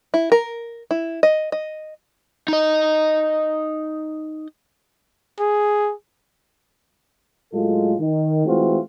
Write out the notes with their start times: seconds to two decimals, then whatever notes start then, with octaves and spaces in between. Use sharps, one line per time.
0.14 E4
0.32 A#4
0.91 E4
1.23 D#5
1.52 D#5
2.48 D#4 D#5
5.40 G#4
7.53 A2 F#3 G#3 F4 A4
7.99 D#3
8.46 E3 G#3 A3 C4 F4 F#4